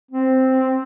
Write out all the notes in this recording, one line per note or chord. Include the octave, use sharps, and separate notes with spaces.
C4